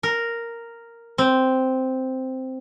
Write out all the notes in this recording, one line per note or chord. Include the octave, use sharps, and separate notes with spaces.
A#4
C4